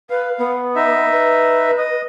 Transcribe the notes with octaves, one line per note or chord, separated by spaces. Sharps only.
B4 F5
B3
D#4 E5
B4
D#5